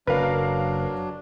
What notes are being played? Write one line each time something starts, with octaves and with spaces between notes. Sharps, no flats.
F#1 F#3 D4 A#4 B4 F5